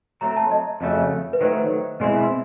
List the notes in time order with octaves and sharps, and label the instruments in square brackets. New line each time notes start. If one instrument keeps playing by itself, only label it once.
[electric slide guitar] F#3 A3 C4 [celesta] A#5
[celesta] A5
D#5
[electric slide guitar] F2 C#3 F#3 A3
[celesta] B4
[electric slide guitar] D#3 F#3 A3 [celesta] C5
[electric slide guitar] B2 G#3 C4 E4